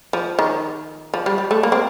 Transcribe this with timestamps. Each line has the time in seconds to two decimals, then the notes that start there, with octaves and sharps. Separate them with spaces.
0.13 F3
0.39 D#3
1.14 F3
1.26 G3
1.38 G3
1.51 A3
1.63 A#3
1.72 C4